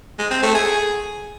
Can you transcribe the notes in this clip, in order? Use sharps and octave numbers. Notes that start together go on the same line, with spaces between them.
G#3
C4
A3
G#4